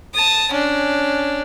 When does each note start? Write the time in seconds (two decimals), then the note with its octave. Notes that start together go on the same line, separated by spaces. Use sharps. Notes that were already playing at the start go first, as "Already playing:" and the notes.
0.14 A5 D#6
0.52 C#4 D4